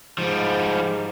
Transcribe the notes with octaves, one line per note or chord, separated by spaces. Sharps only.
G#2 F3 G3